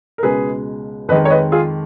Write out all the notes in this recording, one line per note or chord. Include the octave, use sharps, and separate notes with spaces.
A#4
C#2 B2 G#3 G#4 B4
F2 D#3 G#3 B4 D#5
C#5
B4 D#5
F4 G#4